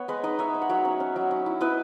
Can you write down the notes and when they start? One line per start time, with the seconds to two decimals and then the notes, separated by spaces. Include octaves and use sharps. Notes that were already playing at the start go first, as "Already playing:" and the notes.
Already playing: B3 C#5 F#5
0.08 G#3 B4 D#5
0.23 D#4 B4 D#5
0.39 D#4 C#5 E5
0.54 D#4
0.62 F#5
0.69 F#3 C#5 E5
0.85 C#4
1.00 C#4
1.16 F#3
1.31 C#4
1.46 E4
1.61 E4 B4 D#5